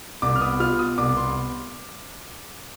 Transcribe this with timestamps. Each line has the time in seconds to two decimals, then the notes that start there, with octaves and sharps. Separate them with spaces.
0.22 C2 D6
0.36 F6
0.41 B3 D#6
0.60 F4 F6
0.79 B2 D#6
0.98 C2 D6
1.17 B3 C6